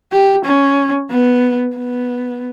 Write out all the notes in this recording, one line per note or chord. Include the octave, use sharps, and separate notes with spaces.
G4
C#4
B3
B3